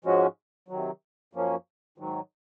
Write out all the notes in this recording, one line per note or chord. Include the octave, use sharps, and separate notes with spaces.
G#2 F3 G#3 C#4 F#4
C3 D#3 F#3
F#2 F3 A#3 C#4
G#2 D#3 F#3